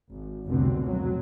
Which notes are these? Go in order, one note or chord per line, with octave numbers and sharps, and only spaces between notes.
G#1
F1 C2 B2 D3 C4
F2 F#3